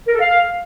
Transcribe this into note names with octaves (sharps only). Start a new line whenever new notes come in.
A#4
A4
F5